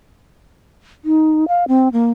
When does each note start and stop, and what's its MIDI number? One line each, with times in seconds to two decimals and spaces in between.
1.05 1.48 63
1.48 1.64 77
1.68 1.89 60
1.93 2.11 58